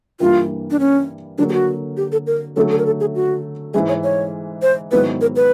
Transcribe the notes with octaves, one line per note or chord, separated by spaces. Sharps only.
G2 E3 G3 A#3 F4
D4
C#4
D3 F#3 A#3 D4
G4
F#4
G4
A4
A#4
D3 F#3 A3 A4
A4
A#4
A4
G#4
F#4
G#2 E3 G#3 G#4
C#5
C#5
C5
G#2 D#3 F#3 B3 E4 B4
A#4
B4